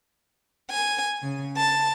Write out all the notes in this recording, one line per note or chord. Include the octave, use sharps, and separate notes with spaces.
G#5
C#3
A5